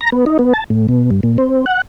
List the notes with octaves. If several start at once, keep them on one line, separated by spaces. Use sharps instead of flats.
A#5
B3
D#4
B3
A5
A2
B2
G2
A#2
C4
F#5